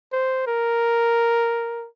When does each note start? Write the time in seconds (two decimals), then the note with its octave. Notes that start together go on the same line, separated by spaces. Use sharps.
0.13 C5
0.47 A#4